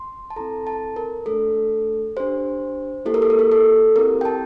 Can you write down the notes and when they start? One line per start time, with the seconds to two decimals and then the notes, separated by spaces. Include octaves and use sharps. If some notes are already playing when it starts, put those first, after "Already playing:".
Already playing: C6
0.30 A5
0.36 C4 E4 A4 A#5
0.67 A5
0.96 A#4
1.26 A3 D4 A4
2.16 D4 G4 C5
3.05 A#3 E4 G4 A4
3.14 A#4
3.22 A4
3.30 A#4
3.39 A4
3.52 A4
3.96 C4 E4 G4 A#4
4.21 G5
4.25 A5